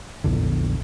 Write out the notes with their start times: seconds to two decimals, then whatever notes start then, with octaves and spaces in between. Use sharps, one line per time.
0.24 A#1 E2 A#2 D3